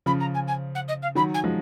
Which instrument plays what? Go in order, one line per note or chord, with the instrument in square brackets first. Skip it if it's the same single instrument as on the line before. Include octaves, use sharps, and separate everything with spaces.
[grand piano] C#3 F3 [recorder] B5
[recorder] A#5
G#5
G#5
F#5
D#5
F5
[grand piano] D#3 F#3 [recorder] B5
[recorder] G#5
[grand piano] F3 G#3